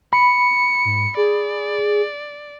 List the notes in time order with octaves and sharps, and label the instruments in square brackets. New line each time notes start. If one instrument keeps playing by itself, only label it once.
[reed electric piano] B5 [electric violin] C#7
[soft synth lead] G#2
[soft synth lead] G#4 [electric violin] D5